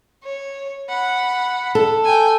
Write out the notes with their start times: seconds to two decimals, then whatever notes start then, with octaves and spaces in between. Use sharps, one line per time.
0.23 C#5
0.89 F#5 B5
1.75 A4
2.04 G5 G#5